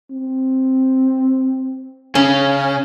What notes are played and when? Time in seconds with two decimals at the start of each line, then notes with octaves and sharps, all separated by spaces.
0.11 C4
2.15 C#3 C#4